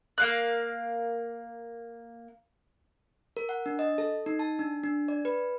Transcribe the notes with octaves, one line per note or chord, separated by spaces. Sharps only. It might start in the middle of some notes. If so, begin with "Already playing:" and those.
A#3 F5 F#6
A#4
F#5
D4
D#5
A4
D#4
A5
D4
D4
D5
B4